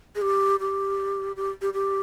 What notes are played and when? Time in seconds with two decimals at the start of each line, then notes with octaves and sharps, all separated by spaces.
0.16 G#4
0.22 G4
0.60 G4
1.36 G4
1.62 G4
1.74 G4